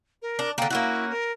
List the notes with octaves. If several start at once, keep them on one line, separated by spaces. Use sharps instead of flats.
A#4
D4
D3 A#3 G5
A#3 C#4 E4 F#4
A#4